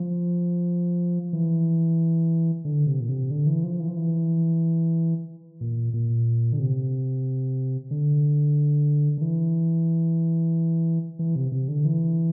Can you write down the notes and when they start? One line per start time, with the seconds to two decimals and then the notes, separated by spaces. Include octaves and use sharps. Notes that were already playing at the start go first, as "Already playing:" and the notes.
Already playing: F3
1.33 E3
2.65 D3
2.87 C3
3.01 A#2
3.09 C3
3.31 D3
3.46 E3
3.64 F3
3.80 E3
3.88 F3
3.96 E3
5.61 A#2
5.93 A#2
6.53 D3
6.59 C3
7.91 D3
9.17 D3
9.21 E3
11.19 E3
11.36 C3
11.52 C3
11.68 D3
11.85 E3